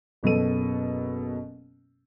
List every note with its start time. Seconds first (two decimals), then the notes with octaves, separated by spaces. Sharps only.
0.23 F#1 B2 F#3 A4 D#7